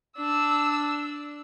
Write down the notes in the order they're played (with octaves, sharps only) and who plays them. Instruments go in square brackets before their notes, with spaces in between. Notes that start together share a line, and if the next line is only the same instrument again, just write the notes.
[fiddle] D4 [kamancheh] E6